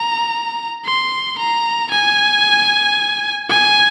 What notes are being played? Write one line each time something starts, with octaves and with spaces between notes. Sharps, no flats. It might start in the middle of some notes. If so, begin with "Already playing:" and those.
Already playing: A#5
C6
A#5
G#5
G#5